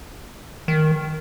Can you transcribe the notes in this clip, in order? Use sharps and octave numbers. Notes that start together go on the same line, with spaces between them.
D#3